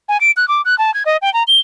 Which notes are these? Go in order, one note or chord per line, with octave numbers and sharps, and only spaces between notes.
G#5
D7
F#6
D6
F#6
A5
G#6
D#5
G5
A#5
G7